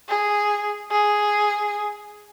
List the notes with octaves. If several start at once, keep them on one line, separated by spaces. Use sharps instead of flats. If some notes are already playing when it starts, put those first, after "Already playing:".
G#4
G#4